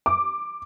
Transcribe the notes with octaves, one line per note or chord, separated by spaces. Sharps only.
D6